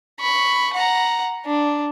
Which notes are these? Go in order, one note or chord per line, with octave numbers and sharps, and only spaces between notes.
B5 C#6
F#5 A#5
D4